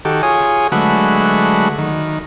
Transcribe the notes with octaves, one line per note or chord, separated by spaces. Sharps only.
D#3 F#4 G4 A4
F4 G#4 C#5 G#5 D#6
D3 F#3 G#3 A3 F#4 B4
D#3